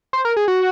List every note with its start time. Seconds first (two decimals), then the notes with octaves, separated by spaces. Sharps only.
0.13 C5
0.25 A#4
0.37 G#4
0.48 F#4